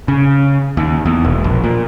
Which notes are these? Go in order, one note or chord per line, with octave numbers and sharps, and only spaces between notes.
C#3
D#2
E2
E1
A#1
A#2